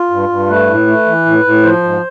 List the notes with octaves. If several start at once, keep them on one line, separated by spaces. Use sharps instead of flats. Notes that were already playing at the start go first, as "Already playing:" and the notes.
Already playing: F4
G2
G2
A3 B4
A2
A3
E3
A2
A2
F3 C5
G#2